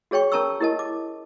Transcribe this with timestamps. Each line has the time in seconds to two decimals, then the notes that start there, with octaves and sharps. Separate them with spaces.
0.11 F#4 G#4 C#5 G5 C#6
0.32 C#4 A#4 A5 A#5 C#6 E6
0.60 E4 G4 A#4 D#5 A5
0.79 D6